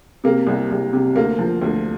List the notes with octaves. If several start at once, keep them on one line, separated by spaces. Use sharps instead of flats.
C3 A#3
C2
C2
C3
D2 A#3
F3
D2